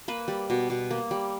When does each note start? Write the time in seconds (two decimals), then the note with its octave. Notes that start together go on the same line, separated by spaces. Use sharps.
0.08 A#3 B4
0.28 G3
0.50 B2
0.70 B2
0.91 A#3
1.11 G3